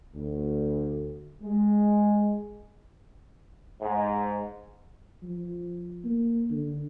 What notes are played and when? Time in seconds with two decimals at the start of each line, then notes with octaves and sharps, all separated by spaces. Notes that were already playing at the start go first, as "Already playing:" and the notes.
0.15 D2
1.42 G#3
3.82 G#2
5.23 F3
6.05 A#3
6.50 D3